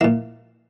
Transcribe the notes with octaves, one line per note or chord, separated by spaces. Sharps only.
A#2 A#3 E4